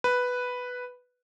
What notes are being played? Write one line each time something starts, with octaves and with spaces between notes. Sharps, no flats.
B4